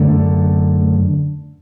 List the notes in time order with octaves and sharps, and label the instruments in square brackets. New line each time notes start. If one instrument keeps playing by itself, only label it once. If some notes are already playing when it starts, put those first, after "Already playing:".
Already playing: [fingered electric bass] F#2 D3 A3